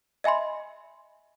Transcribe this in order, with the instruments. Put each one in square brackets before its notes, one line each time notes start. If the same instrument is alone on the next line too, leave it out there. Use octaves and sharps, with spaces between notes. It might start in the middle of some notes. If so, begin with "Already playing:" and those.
[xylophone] D#5 E5 G#5 B5 C6